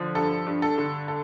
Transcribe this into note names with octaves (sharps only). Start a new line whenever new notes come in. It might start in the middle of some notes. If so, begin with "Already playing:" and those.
Already playing: D3 F3
G2 A4
G2
A4
D3
A4